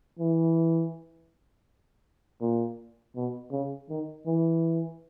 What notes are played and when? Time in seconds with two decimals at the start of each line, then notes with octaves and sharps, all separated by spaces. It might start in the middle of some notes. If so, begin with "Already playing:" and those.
0.19 E3
2.41 A#2
3.16 B2
3.51 C#3
3.90 D#3
4.26 E3